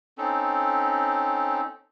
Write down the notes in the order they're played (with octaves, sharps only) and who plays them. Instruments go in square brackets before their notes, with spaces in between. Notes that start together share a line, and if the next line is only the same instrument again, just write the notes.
[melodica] C4 C#4 D#4 A4